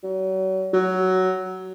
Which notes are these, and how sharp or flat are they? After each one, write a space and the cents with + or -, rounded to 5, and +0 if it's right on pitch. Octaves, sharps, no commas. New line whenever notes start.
F#3 +35
F#3 +10